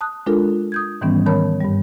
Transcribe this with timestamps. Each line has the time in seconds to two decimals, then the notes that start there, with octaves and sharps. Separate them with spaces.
0.01 A5 D#6 F#6
0.26 G#3 D4 F4 A4 A#4
0.72 D#6 G6 G#6
1.01 G#2 D#3 E3 G3 B3 C#4
1.26 D#3 A#4 C#5 A5 B5
1.61 G2 G3